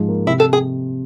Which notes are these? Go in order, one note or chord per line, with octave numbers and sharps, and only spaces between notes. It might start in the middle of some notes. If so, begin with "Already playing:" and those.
Already playing: G#2 F3 G#3
A#3
C3 E4
A4
G#4